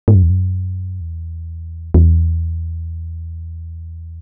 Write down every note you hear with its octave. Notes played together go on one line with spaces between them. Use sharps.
G#2
F#2
E2
F#2
E2
E2